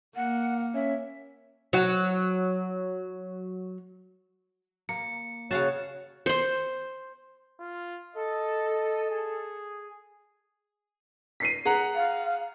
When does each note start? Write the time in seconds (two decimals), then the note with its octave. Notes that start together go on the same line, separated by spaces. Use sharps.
0.16 A#3 F#5
0.75 C#4 E5
1.73 F#3 F#4
4.89 A#3 C#7
5.51 C#3 F#4 C#5 F5 A5
6.26 C5 C6
7.60 F4
8.15 A4 D#5
9.10 G#4
11.40 B6 C7 D#7
11.65 G#4 F#5 A#5
11.95 F5